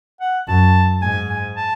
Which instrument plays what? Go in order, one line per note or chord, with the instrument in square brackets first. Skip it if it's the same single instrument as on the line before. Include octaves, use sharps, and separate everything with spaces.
[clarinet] F#5
[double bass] F#2 [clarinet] A5
[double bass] G#2 [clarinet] G#5
[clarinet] G#5
A5